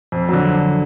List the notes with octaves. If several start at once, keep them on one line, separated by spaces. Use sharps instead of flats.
F2
D3 F#3